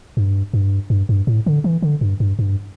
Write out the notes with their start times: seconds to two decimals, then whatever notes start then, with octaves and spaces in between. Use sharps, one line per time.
0.17 G2
0.54 G2
0.90 G2
1.09 G2
1.27 A2
1.46 D3
1.64 E3
1.82 D3
2.01 G2
2.20 G2
2.39 G2